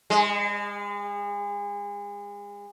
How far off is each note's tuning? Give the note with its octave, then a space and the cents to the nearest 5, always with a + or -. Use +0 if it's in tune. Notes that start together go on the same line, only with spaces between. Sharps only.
G#3 -35